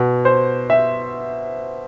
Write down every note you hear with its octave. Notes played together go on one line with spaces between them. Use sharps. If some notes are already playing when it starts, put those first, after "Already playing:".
Already playing: B2
C5
E5